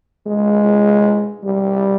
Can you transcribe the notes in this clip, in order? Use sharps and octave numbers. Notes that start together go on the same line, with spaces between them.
G#3
G3